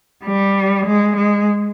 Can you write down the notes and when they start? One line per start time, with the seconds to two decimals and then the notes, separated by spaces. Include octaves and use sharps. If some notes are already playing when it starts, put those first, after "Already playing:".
0.24 G3
0.86 G#3
1.17 G#3